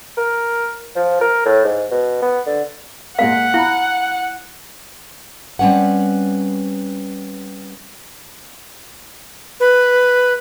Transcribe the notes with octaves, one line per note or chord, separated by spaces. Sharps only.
A#4
F3
A#4
A2
G#2
B2
B3
D3
A#2 G#3 A#4 F5 F#5
E4 F5 B5
G3 C4 C#4 B4 F#5
B4